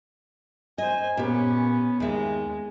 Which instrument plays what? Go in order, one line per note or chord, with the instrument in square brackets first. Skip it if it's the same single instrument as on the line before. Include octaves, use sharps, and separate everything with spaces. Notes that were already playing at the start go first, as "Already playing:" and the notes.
[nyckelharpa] C5 G#5 [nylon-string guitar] D#5
[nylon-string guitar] A#2 G4 [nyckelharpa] B3 C#4
[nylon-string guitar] D#2 E5 [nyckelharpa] G#3